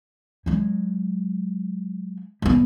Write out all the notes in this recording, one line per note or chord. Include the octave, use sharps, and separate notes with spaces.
F#3 G#3
G3 B3